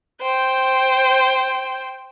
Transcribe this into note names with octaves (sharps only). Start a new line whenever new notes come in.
C5 G5